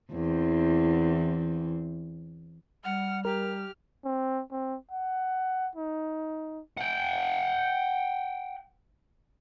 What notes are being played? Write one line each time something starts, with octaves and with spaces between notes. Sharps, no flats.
E2 E3 C4
G3 F#5 F6
G4 A#4 F6
C4
C4
F#5
D#4
F#5 G5